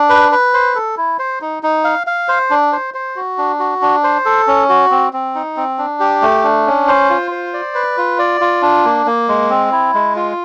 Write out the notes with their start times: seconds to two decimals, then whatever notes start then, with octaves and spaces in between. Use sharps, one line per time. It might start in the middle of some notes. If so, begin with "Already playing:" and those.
Already playing: D4
0.09 B4
0.32 B4
0.54 C5
0.75 A4
0.97 E4
1.19 C5
1.41 D#4
1.63 D#4
1.84 F5
2.07 F5
2.28 C5
2.50 D4
2.72 C5
2.94 C5
3.16 F#4
3.38 D4
3.60 F#4
3.82 D4
4.04 C5
4.25 A4
4.47 C#4
4.69 F#4
4.91 C4
5.13 C4
5.35 D#4
5.57 C4
5.78 D4
6.00 G4
6.22 A3
6.44 D4
6.66 C#4
6.88 C5
7.10 F4
7.31 C5
7.53 D5
7.75 B4
7.98 F4
8.19 D5
8.41 F4
8.62 D4
8.85 A#3
9.06 A#3
9.28 G#3
9.50 C4
9.72 E4
9.94 G#3
10.16 F4